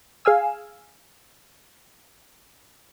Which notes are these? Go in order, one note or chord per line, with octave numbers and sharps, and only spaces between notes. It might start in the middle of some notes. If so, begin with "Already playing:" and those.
G#4 F5 G#5 E6